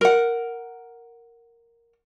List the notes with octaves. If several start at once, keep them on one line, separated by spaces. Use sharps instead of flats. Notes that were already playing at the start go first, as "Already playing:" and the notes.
A#4 F#5